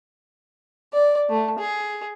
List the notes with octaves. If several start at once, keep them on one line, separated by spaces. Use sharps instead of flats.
D5
A3
G#4